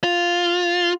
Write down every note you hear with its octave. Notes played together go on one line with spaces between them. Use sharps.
F4